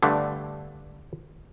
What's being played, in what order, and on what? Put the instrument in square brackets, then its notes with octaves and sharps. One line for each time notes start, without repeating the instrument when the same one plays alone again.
[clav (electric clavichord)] G2 D3 A3